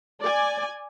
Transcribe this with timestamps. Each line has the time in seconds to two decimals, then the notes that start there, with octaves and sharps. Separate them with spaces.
0.22 D5 G#5